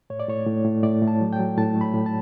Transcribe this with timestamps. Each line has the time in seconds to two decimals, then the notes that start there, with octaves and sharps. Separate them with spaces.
0.10 A2 C#5
0.20 D5
0.28 A2 C#5
0.47 A2
0.65 A2
0.83 A2 D5
1.02 A2
1.08 A5
1.21 F#3
1.33 G5
1.39 F#3
1.57 A2 A5
1.75 A3
1.81 B5
1.94 A2
2.06 A5